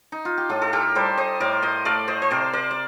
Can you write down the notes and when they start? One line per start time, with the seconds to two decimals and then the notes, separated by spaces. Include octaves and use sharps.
0.12 D#4
0.25 F4
0.38 G4
0.49 A2 F4 A4
0.62 A4
0.73 G4 A#4
0.95 G3 A4 C5
1.17 C5 D#5
1.40 A2 A#4 D5
1.62 C5 D#5
1.85 A3 D5 F5
2.08 C5 D#5
2.22 C5
2.31 C3 A#4 D5
2.53 A#4 D5
2.71 D5